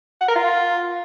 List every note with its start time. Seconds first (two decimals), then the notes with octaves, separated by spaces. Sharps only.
0.21 F#5
0.28 A#4
0.36 F4